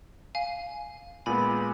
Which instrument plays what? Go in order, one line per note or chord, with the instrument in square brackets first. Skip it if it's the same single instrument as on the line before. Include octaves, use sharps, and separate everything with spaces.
[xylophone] F5 G#5
[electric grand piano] A#2 G#3 B3 [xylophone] G#5 B5